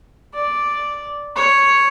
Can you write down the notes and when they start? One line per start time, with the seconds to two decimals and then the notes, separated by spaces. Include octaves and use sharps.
0.34 D5
1.36 C#5